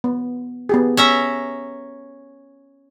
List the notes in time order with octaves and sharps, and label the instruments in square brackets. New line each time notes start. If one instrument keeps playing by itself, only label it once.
[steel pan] B3
B3 G4 G#4
[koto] C#4 E5 A#5